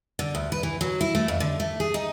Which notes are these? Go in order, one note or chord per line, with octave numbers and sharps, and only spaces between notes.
D3
D2
B4
E3
F#3
E4
A3
F2
D3
A3
G#4
D#4